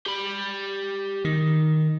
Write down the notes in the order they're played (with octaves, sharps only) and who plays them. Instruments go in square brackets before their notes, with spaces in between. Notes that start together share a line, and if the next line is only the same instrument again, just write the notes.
[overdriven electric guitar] G4 B5
[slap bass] D#3